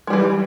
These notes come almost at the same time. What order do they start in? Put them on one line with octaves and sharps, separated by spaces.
G#3 G3 E3